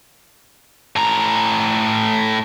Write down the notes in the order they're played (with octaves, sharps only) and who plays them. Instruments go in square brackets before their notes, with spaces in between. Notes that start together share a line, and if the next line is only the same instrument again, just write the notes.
[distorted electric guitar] A2 A#5